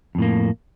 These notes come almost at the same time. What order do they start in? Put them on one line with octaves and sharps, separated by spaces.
F2 A2 A#3